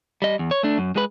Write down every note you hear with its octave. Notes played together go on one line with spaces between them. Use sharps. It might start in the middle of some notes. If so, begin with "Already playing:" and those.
G3 D#5
E2
C#5
A3 D4
F#2
G#3 B4